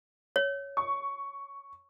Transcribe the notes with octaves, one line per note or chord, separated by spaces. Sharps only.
C#5
C#6